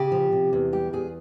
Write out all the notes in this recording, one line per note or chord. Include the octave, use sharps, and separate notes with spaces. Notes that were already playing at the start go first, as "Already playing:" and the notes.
Already playing: C#3 G4
F3
C3
E2
G3 G4
E2 G#4